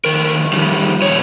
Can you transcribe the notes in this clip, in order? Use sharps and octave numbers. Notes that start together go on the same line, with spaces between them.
F2 D#3 A#4
F2 D#3 G3
A#2 G3 C#5